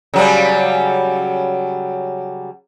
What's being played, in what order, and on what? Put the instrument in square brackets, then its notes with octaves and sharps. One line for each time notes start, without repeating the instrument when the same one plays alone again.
[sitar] C#3 F#3 G3